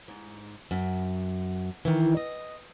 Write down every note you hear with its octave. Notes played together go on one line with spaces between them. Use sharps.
G#2
F#2
D#3 E3
D#5